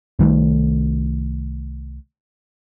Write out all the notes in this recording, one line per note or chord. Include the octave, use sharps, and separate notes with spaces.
C2 D#3 E3 A3